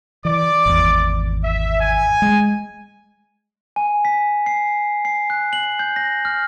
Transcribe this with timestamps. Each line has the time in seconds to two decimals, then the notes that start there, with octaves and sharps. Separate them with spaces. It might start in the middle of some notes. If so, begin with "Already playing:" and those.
0.25 E3 D5 D6
0.66 G#1 E2
1.44 E5
1.81 G#5
2.22 G#3
3.76 G#5
4.05 B6
4.46 C7
5.05 C7
5.30 F#6
5.53 F#7
5.79 G6
5.96 A#6
6.25 F6